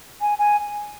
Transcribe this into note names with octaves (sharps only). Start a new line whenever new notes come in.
G#5
G#5